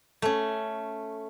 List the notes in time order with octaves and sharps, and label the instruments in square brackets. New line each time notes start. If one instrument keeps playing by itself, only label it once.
[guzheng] A3 C#4